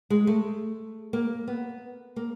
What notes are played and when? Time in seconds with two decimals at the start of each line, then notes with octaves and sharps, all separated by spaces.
0.10 G#3
0.27 A3
1.13 A#3
1.48 B3
2.16 A#3